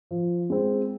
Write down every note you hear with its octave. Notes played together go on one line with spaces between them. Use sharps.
F3
G#3 C4